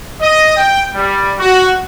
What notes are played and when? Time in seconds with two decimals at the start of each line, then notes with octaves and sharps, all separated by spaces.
0.20 D#5
0.56 G5
0.95 G3
1.38 F#4